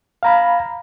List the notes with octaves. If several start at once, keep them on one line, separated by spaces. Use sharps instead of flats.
F5 A#5 B5